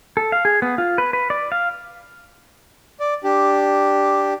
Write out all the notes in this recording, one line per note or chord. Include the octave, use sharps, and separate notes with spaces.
A4
F5
G#4
B3
F4
B4
B4
D5
F5
D5
D4 G4